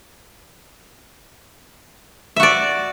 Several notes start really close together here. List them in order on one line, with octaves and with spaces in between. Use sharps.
E5 F#4 D5